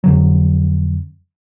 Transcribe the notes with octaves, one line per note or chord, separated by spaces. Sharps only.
F2 D3 F#3